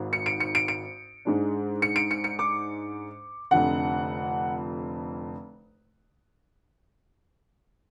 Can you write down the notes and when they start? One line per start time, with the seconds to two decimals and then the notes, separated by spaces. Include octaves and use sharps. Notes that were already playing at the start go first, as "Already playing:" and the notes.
Already playing: G#1 G#2
0.13 C#7
0.26 D7
0.40 C#7
0.55 D7
0.68 D7
1.25 G#2 G#3 D4
1.82 C#7
1.96 D7
2.11 C#7
2.24 C#7
2.39 D6
3.51 F1 F2 D3 F#5